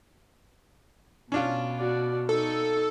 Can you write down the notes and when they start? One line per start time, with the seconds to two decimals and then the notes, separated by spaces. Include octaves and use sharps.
1.32 B2 C#4 D4 F4
1.78 F#4 D5
2.29 D#4 A4 C#6